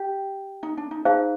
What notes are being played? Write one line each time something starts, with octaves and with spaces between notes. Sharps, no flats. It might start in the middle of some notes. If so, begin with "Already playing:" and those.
Already playing: G4
D#4
D4
D#4
D#4 G#4 C5 F5 A5